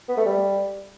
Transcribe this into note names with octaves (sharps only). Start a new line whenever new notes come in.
B3
A3
G3